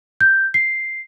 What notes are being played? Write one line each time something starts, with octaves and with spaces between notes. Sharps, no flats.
G6
C7